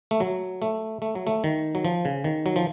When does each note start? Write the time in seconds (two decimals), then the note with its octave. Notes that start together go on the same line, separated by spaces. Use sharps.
0.11 A3
0.20 F#3
0.62 A3
1.02 A3
1.15 F#3
1.27 A3
1.44 D#3
1.75 F#3
1.85 F3
2.05 C#3
2.24 D#3
2.46 F#3
2.56 F3